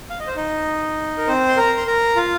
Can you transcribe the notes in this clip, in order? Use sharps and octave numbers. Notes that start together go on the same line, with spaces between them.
F5
D#5
C5
D#4 D#5
A#4
C4 C5
C6
A#4 A#5
C6
A#4 A#5
F4 F5